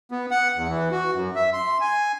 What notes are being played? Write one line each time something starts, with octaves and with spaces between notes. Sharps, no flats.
B3
F#5
E2
E3
F#4
F#2
E5
C6
G#5